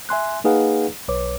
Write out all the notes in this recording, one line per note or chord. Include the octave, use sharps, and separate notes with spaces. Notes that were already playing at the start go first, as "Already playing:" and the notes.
E5 G#5 C6 F#6
A#3 D#4 G#4 B4 F5 F#5
B1 B4 C#5 D6